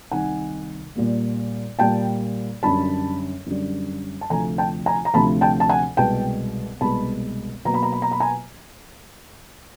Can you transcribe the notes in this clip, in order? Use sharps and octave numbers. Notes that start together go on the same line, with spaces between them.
C2 C3 D#3 F#5 G#5
A#2 G3 A#3
A#2 G3 A#3 G5 A5
F#2 D3 G3 A5 B5
F#2 D3 G3
A5
D2 C3 F3 A3 G#5 A#5
G5 A5
G#5 A#5
A#5
D2 C3 F3 A3 A5 B5
G5 A5
A5
F#5 G#5
C2 B2 G#3 B3 G5 A5
C2 B2 G#3 B3 A5 B5
B2 F#3 A#3 A#5
B5
A#5
B5
A#5
B5
G#5 A#5